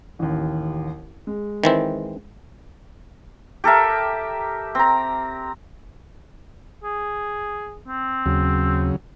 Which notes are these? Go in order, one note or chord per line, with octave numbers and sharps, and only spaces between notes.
A1 D#2
G#3
D#3 E3 C4
G4 A4 A#4 E5
C4 A#5
G#4
C4
D#2 C#3 F#3